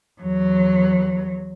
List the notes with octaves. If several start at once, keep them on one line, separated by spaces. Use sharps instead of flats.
E2 F#3